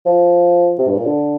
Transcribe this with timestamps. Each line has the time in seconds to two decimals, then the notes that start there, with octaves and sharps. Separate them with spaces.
0.06 F3
0.78 C3
0.88 G2
0.97 A#2
1.06 D3